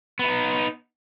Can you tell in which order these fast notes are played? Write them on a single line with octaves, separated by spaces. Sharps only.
B3 E4 D#4